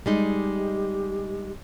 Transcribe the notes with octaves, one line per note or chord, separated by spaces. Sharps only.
G3 G#3 D#4 G4